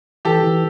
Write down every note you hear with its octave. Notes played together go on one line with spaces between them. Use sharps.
E3 G4 A4
E3